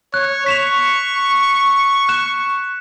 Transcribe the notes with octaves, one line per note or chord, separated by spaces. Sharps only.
C#5 F#6
C#6 B6 E7 F7
F#6 E7